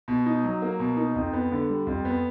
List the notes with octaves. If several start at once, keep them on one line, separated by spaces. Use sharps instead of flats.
B2
D#4
F#3
A#3
B2
D#4
F2
B3
D3
G3
F2
B3